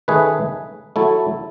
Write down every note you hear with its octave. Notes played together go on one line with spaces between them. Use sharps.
D#3 A3 C#4 G#4 B4
F#3 A3 E4 A4